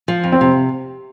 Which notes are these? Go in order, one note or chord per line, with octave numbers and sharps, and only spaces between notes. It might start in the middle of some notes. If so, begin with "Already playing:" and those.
F3
F2
C4
C3